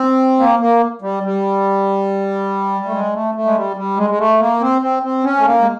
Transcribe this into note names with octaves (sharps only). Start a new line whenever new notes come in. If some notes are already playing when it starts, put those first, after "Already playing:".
Already playing: C4
A#3
A#3
G3
G3
A3
G#3
A3
A3
G#3
G3
G3
G#3
G#3
A3
A#3
C4
C4
C4
C#4
A3
A#3
G#3